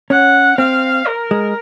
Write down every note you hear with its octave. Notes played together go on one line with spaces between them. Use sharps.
C#4 F#5
C4 F5
A#4
G#3